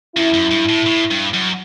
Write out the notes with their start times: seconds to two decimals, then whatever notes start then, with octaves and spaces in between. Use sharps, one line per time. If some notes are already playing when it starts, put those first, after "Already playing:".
0.16 F#2 E4
0.33 F#2
0.51 G2
0.69 A2
0.86 A2
1.11 G2
1.34 F#2